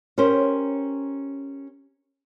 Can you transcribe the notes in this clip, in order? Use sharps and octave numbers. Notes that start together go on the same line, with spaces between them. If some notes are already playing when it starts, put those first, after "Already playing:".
C#4 G4 A#4 C5